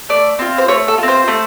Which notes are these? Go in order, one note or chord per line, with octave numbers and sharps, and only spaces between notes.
A3 D5
C4 F4
C5
A3 C#5
A4
C4 F4
C5
A3